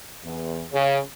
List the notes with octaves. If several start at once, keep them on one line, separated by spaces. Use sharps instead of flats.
E2
C#3